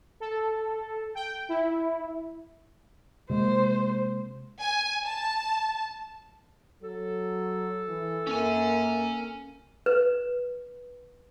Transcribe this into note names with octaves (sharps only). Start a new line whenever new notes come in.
A4
G5
E4
C3 G#3 A#3 C5
G#5
A5
F#3 A4
E3
F#2 A#3 C#4 G#5
B4